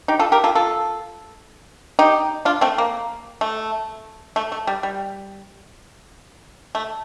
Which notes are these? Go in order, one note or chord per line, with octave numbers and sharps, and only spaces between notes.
D#4 G4
F4 A4
G4 A#4
F4 A4
F4 A4
D#4 G4
D4 F4
A3 C4
A#3
A3
A3
A3
G3
G3
A3